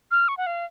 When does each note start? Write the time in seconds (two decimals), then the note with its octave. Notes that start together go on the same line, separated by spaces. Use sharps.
0.11 F6
0.28 C#6
0.37 F#5
0.46 F5